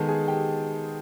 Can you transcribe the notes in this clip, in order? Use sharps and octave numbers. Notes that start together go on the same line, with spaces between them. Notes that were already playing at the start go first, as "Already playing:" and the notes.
Already playing: D#3 G#3 B3 A4 A5
G#4 G#5
G4 G5